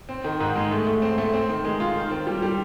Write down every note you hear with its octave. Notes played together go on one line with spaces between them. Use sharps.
C4
D#3
G#2
G#3
A3
A3
C4
A3
C4
D#3
G#3
F4
D#3
C4
G3
G3